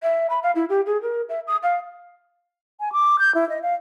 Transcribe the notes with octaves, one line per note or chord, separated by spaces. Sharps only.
E5
B5
F5
E4
G4
G#4
A#4
E5
D#6
F5
G#5
D6
G6
E4
D#5
F5